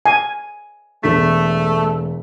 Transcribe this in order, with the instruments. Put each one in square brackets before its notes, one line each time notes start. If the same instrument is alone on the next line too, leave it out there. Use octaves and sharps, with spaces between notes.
[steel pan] G#5
[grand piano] E1 B6 [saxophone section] A3